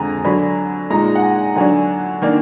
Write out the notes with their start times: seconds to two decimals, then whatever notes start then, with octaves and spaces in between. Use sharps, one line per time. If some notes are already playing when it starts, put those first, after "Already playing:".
Already playing: F2 D3 G#3 G#5 A#5
0.24 D3 F#3 D4 B5
0.90 A#2 G#3 D#4 A#5
1.15 F#5
1.22 G#5
1.56 D3 F#3 D4 G#5
2.22 D#3 A#3 D4